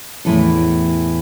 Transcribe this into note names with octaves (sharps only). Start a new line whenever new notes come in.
E2 A2 E3 A4